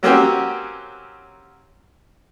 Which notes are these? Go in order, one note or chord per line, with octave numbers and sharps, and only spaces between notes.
F#3 A#3 C4 C#4 F#4 G4